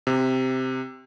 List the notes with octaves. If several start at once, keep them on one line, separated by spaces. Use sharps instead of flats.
C3